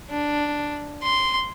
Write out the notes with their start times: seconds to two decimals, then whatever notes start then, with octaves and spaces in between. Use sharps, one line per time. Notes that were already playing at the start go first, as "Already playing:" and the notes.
0.11 D4
1.03 C6